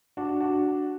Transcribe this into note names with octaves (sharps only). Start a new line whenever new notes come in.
D4 F#4
D4 F#4